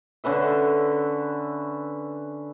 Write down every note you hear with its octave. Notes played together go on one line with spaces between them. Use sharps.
D3 C#4 B4 E5